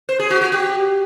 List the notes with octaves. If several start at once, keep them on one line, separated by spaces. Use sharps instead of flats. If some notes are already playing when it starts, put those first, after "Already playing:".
C5
G#4
F#4
F#4
G4